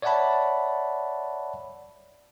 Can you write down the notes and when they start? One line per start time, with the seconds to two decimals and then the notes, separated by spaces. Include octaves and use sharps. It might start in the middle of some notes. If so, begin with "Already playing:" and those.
0.02 C#5 D5 E5 F#5 A5 B5